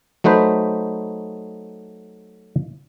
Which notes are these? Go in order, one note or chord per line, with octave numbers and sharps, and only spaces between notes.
F#3 A3 D#4 B4 C5